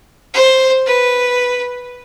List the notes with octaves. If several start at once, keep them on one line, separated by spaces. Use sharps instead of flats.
C5
B4